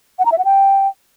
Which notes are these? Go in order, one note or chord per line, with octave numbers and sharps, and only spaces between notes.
F#5
A#5
E5
F#5
G5